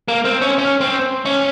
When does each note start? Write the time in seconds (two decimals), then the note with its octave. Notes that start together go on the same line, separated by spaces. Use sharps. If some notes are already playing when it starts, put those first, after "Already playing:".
0.08 A#3
0.25 C4
0.41 C#4
0.58 C#4
0.81 C4
1.26 C#4